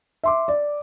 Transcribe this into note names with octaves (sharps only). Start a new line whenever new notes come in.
E5 C6 D6
D5